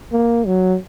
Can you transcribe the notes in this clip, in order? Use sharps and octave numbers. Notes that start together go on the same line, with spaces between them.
A#3
F#3